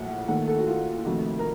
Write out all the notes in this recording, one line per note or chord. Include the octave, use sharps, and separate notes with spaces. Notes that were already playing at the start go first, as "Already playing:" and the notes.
Already playing: A#1 A2 F#3 F#5
D#2 D#3 A3 F#5
A4
F#4
F4
F4
F1 F2 D#3 A3 F#4
A#4